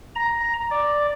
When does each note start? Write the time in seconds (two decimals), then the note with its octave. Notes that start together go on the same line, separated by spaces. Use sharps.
0.16 A#5
0.71 D5